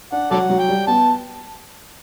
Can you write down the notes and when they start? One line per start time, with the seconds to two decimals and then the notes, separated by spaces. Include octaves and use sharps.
0.12 D4 F#5
0.31 F#3 A4 D5 F#5
0.49 F#3
0.59 G5
0.69 G3
0.87 B3 A5